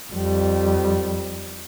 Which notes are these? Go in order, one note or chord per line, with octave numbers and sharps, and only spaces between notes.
F2 G3